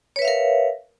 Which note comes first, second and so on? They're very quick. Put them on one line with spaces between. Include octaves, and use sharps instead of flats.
C#5 B4 E5 F5 A#4